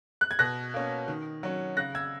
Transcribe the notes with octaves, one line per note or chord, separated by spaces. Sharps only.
F#6
G#6
B2 F#6 A#6
A#3 C#4
D#3
F#3 C#4
C#3 F#6 A#6
E6 G#6